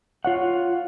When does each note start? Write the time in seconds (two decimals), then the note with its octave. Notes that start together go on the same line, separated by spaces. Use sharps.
0.25 F4 C#5 F#5